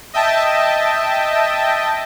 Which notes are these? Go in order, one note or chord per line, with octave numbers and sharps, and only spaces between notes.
D#5 E5 G5 A5